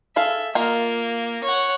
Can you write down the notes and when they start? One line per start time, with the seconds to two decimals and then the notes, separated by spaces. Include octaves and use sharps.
0.16 G#4 A4 E5 F5
0.55 A#3 F4 A#4 D#5
1.44 C#5 F#5